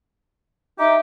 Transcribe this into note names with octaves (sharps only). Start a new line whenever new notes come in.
D#4 G4 E5